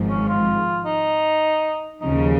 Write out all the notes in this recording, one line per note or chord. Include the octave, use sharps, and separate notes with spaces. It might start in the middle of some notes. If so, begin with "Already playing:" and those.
Already playing: G#1 G#2 F3
C#4
F4
D#4
D#2 C#3 F3 D#4